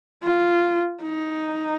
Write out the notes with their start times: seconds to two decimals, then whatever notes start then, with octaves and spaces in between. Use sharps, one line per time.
0.23 F4
1.03 D#4